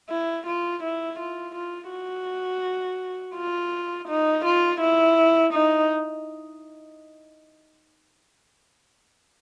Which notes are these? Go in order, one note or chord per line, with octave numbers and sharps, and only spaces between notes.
E4
F4
E4
F4
F4
F#4
F4
D#4
F4
E4
D#4